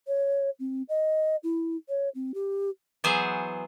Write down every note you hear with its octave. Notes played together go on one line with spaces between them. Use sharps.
C#5
C4
D#5
E4
C#5
C4
G4
E3 F#3 B3 G#4 C5